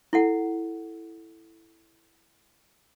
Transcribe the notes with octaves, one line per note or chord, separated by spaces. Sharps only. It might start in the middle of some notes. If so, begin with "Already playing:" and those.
E4 A4 F#5